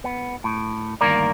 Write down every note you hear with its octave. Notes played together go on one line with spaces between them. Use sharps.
B3
A2
D2 G2 D#3 A#3 A#4 D5